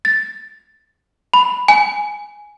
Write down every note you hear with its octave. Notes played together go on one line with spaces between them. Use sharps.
A6
B5
G#5